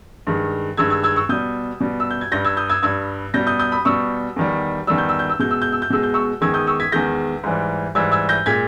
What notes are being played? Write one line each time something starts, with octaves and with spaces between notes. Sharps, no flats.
G2 D#3 G#3
G2 D#3 G#3 E6 G#6
E6 G#6
E6 G#6
C#6 E6
B2 G3 D#6 G6
B2 G3
E6
G6
G#6
G2 G3 G6 A#6
E6 G#6
D#6 G6
E6 G#6
G2 G3 E6 G#6
B2 G3 G6 A#6
D#6 G6
D#6 G6
B5 D#6
B2 G3 C#6 E6
E2 D#3 G3
E2 D#3 G3 E6
G6
E6
G6
E6
B2 G#3 G6
E6
G6
E6
G6
B2 G#3 E6
G6
C#6 E6
E2 D#3 G#3 E6 G#6
D#6 G6
C#6 E6
G#6 B6
E2 D#3 G#3 G6 A#6
G#2 E3 G3
G#2 E3 G3 E6 G#6
E6 G#6
G6 A#6
A#2 G#3 G#6 B6